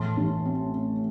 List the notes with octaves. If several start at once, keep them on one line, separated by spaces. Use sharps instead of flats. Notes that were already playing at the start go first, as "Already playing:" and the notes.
Already playing: A2 E3 A5 C6
A1
C4
C4